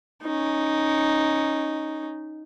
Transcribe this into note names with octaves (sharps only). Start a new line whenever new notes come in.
C#4 D#4